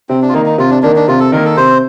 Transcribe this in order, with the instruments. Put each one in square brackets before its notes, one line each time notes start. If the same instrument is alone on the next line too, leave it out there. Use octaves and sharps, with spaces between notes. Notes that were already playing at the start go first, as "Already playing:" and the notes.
[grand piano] C3 [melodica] C4
[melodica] D4
F4
[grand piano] D#3 A#3 [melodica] D#4
[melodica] D#4
[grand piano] C3 [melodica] F4
[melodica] D4
[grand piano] D#3 A#3 [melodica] D4
[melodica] D4
[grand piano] C3 [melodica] F4
[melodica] A4
[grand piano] D#3 A#3 [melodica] A#4
[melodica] A4
[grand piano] C3 [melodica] C5